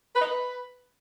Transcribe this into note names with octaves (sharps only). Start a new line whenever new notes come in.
B4
D#4
B4